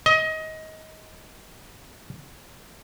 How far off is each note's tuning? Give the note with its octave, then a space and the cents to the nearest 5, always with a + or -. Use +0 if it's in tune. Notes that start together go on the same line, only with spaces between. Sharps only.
D#5 +20